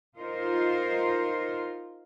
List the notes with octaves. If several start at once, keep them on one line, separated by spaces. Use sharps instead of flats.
D#4 F4 A#4 C5